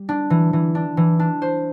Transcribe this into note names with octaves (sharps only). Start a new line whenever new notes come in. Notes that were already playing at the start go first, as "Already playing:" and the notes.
Already playing: G3
D4
E3
E3
D4
E3
D4
C5